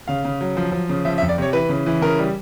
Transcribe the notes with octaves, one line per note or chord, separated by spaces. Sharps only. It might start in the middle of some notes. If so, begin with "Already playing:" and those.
C#3 F5
C#3
F#3
F3
F3
C#3
F3 E5
E5
F2
D5
C3 C#5
E3 B4
C#3
E3
C#3 A#4
G3